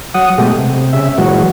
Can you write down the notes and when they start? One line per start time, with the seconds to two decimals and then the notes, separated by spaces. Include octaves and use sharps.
0.14 F#3 F#5 D#6
0.38 B2 G#3 A3 G4
0.58 C3
0.93 C#3 E5
1.18 A#2 E3 F#3 G#3 F#4